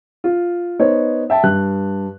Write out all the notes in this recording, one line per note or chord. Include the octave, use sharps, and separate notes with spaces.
F4
B3 D#4 C5 C#5
E5 G5 A5
G2 F#6